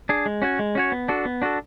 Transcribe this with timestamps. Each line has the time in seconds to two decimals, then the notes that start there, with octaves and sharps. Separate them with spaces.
0.09 D4 G#4
0.26 G#3
0.42 C#4 F#4 C#5
0.59 G#3
0.75 C#4 F#4 C#5
0.92 B3
1.08 D4 F#4 A4
1.25 B3
1.42 D4 F#4 A4